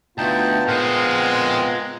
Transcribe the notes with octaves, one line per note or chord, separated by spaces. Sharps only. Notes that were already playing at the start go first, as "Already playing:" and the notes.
D2 B3 D#4 F4 G5 A5
A#2 G#3 C4 A#4 F#5